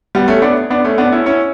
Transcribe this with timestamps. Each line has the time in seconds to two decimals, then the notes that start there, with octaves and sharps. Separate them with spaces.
0.15 G3 B3
0.28 A3 C#4
0.42 B3 D4
0.70 B3 D4
0.85 A3 C#4
0.98 B3 D4
1.12 C#4 E4
1.26 C#4 E4